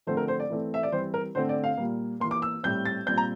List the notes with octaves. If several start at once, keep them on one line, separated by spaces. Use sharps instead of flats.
D3 F3 A3 C4 C5
A#4
C5
D5
E3 A3 C4
E5
D5
E3 G3 C4 C5
A#4
D3 A3 C4 C5
D5
F5
A#2 G3 A#3
E3 A#3 C6
D6
E6
A2 G3 C4 G6
A6
A#2 G3 C4 G6
A#5